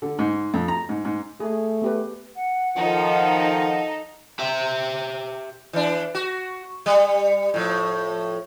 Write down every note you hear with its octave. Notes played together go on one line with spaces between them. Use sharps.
D3
G#2
F2
A#5
G#2
G#2
A3 G#4
B3 G4 B4
F#5
D#3 F3 D#4 A4
G4 E5
E3 D4
F#4
G3
A2 F3